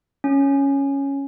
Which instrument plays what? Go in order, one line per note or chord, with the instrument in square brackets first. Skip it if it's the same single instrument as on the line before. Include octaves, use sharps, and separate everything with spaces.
[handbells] C#4